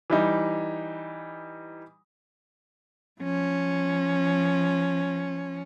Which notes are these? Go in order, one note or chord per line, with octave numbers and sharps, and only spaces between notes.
E3 G3 D#4
F3 C#4